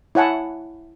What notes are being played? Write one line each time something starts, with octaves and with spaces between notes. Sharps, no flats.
E4 C#5 F#5 G#5 A5